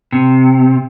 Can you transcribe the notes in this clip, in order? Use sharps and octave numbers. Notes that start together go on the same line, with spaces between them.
C3